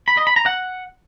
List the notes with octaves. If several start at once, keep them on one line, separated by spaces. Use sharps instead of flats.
B5
D#5
B5
A#5
F#5